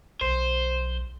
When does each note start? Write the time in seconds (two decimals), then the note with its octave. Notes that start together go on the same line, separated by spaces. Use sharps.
0.21 B1 C5